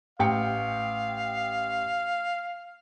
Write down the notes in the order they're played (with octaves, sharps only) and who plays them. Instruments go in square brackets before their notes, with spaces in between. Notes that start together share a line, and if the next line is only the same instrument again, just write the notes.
[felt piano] A1 G5 C#7 [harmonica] F5